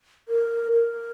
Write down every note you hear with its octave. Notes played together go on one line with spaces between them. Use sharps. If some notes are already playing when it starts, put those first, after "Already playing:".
A#4
A#4